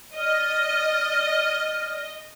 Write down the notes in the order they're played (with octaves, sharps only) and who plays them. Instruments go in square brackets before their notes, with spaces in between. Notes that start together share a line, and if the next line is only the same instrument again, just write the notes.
[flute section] D5 F6 [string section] D#5